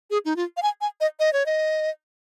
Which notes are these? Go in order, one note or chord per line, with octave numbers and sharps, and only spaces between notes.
G#4
D#4
F4
F5
G#5
G#5
D#5
D#5
C#5
D#5